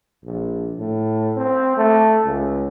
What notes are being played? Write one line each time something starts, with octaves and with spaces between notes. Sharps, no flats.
A#1
A2
C4
A3
C#2